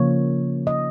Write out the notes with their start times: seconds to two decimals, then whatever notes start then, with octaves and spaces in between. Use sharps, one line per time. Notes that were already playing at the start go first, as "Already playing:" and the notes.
Already playing: C#3 F3 A#3 C#5
0.67 D#5